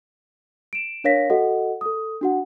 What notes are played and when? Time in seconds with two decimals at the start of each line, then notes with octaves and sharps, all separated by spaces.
0.73 D7 E7
1.04 D4 A#4 C#5 F5 A#6 B6
1.30 F#4 A4 D#5 F#5
1.81 A4 D#6
2.21 D4 F#4 F#5